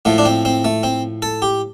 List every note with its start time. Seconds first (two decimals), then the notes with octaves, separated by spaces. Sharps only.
0.05 A2 F3 A3
0.18 D4
0.25 C4
0.45 C4
0.65 A3
0.83 C4
1.22 A4
1.42 G4